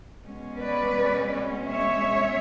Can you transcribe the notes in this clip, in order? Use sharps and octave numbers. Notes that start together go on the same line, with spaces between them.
B2 G#3 C#4
B4 D5
C#5 E5